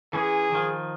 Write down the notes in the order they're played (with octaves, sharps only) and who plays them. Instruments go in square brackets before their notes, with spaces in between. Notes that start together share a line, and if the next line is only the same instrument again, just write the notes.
[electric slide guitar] E3 C#4 [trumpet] G#4
[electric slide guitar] D#3 F3